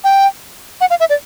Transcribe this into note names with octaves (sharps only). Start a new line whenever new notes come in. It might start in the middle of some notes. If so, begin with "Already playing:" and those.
G5
F#5
F5
E5
D5